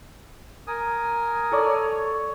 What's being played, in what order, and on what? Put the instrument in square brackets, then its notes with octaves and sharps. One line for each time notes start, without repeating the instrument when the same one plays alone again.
[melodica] A#4 G#5 D#6
[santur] A4 C#5 D5